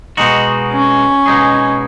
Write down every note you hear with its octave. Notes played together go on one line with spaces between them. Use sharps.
B2 G#3 D#4 F#4
C#4
B2 G#3 D#4 G#4